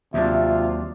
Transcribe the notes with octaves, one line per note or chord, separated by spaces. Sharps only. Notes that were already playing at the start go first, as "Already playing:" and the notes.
D#2 C3 F#3 D4 F4 E5